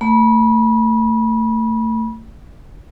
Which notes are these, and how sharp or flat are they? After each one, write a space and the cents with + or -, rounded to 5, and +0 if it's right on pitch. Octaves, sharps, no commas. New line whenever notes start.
A3 +30 B5 -30